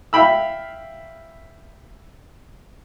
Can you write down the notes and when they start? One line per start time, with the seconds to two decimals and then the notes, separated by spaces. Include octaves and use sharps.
0.13 E5 F5 G5 B5 E6